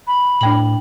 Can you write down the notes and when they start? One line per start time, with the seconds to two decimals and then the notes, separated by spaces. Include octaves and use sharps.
0.07 B5
0.41 A2 D4 G5 F#7